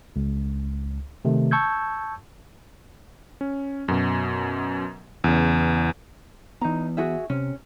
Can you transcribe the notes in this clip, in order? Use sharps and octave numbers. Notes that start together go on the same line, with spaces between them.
C#2
C3 D#3 A3
A5 C#6 E6 G6 G#6
C#4
F#2 B2
E2 C#3
E3 B3 D#4 A#5
F#4 G#4 E5
C3 C#4